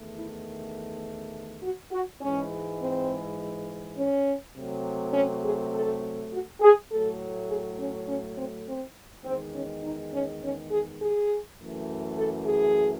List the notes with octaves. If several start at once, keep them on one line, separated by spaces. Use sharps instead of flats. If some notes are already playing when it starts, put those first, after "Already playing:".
Already playing: E2 D#3 A3
E4
F#4
F#4
G#2 E3 G#3 C#4
C4
C#4
C3 F#3 A3
C#4
G#4
A4
F#4
G#4
A2 F#3 A3 A4
G#4
C#4
C#4
C4
C4
E2 D#3 G#3 C4
C#4
D#4
C#4
C#4
G#4
G#4
F#2 E3 A3
A4
G#4